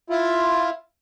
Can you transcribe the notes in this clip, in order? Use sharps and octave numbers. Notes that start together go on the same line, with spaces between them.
E4 F4